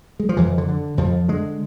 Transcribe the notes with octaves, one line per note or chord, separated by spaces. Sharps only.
G#3
F3
F2 E3
D3
D3
F2 F3
D3 G#3